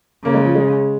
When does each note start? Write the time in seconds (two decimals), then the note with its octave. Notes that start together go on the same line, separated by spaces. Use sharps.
0.25 C#3 A#3
0.34 G#3
0.45 F3
0.55 G#3